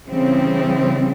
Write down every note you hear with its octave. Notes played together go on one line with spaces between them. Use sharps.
C#3 E3 G3 C4